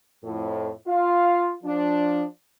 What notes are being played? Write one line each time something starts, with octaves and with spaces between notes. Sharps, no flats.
F2 A2
F4 F5
F3 D4